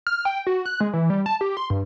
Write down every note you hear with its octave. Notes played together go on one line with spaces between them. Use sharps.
F6
G5
F#4
F#6
G#3
E3
G3
A5
G4
C6
G2